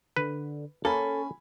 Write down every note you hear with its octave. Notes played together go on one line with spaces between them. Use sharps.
D3 B4
A#3 C#4 A4 G#5 B5